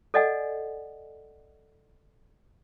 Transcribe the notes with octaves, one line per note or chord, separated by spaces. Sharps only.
A4 D5 D#5 F#5 G#5